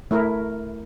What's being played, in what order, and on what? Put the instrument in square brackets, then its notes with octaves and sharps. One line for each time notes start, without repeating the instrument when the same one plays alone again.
[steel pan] A3 E4 A#4